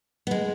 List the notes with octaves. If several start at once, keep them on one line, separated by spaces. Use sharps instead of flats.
B3
G#3